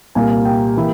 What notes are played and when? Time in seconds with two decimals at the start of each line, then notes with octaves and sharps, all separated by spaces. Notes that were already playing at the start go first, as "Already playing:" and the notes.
0.15 C2 A#2 G3 A#3 G#5
0.30 F5
0.45 G5
0.77 C3 E3 A#3 E4